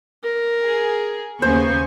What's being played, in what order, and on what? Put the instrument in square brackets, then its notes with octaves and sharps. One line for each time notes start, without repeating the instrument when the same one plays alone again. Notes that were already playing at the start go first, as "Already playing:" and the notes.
[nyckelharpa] A#4
[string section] G#4
[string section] D#2 G#5 C#6 [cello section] C#3 A#3 B3 [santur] C5